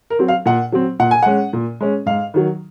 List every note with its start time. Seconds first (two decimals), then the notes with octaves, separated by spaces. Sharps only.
0.10 A#4
0.19 F#3 C4
0.28 F5
0.46 A#2 F#5
0.72 F#3 C4
1.00 A#2 F#5
1.11 G#5
1.23 G#3 C#4 F#5
1.53 A#2
1.81 G#3 C#4
2.06 G#2 F5
2.34 D#3 F#3